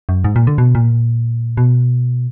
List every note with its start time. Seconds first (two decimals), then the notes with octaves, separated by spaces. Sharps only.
0.09 F#2
0.24 G#2
0.36 A#2
0.47 D3
0.58 B2
0.75 A#2
1.57 B2